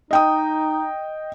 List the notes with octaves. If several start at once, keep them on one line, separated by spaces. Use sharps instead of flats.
D#4 D#5 G5 D#6